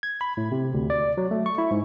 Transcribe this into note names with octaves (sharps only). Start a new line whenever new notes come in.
G#6
B5
A2
C3
D2
D5
F#3
A3
C#6
E4
G#2